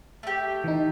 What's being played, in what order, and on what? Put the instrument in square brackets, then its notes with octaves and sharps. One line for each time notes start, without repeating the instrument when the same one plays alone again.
[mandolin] A3 G4
[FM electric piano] E3 D#4